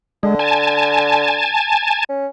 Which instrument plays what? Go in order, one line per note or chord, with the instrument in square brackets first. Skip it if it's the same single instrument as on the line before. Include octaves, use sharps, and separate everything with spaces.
[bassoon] D3 [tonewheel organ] G#3
[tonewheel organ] G#5 A5
[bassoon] C#4